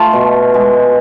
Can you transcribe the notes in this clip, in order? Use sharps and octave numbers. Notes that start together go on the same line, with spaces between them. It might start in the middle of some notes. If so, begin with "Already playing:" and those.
Already playing: A3 F4
B2
G#3